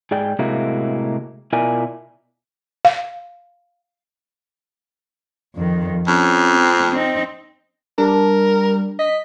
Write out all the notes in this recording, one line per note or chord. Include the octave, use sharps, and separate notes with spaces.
G#2 G#4 D5 G5
A2 C3 G#3 A#3 E4 F#4
B2 E4 F4 A#4 D5 G#5
F5
F2 D#3
F2 C#4
C4
C4 D#4
G3 D4 A#4
D#5 B6